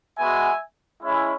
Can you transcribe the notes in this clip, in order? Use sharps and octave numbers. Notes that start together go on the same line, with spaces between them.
G#3 B3 F#4 E5 G#5
G#3 C#4 E4